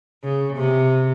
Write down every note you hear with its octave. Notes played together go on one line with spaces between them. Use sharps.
C#3
C3